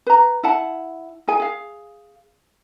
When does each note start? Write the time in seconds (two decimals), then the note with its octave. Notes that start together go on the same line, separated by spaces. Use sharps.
0.07 B4 A#5
0.43 E4 F#5 A5
1.28 E4 G#4 G#5
1.40 G#4 F5